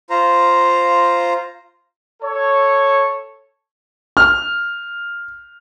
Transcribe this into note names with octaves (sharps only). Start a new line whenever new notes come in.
F4 C5 A#5
A4 C#5
F6